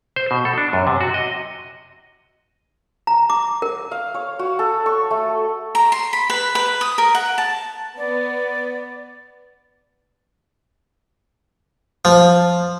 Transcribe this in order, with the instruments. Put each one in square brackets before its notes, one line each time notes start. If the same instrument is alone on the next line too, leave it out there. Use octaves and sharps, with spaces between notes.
[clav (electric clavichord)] C5
B2
A4
D4
F#2
C3
F#4
D#5
[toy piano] A#5
D6
A#4
[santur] F5
C#5
F#4
A4
C#6
A3
[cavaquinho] A#5
C6
B5
B4
B4
D#6
A#4
F#5
A5
[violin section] B3 [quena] D5
[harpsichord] F3